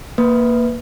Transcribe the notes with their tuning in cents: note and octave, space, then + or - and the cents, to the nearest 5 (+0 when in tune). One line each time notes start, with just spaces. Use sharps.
A#3 +0 B4 +0